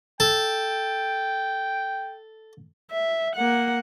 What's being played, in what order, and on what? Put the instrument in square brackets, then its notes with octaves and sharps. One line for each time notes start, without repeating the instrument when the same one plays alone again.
[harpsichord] A4 [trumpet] G5
[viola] E5
A#3 F#5